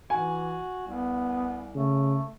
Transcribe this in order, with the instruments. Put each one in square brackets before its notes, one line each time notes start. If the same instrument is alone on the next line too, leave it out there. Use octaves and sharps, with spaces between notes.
[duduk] E3 [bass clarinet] F#4 [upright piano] G#5
[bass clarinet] C2 [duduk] B3
[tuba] C#3 [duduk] A3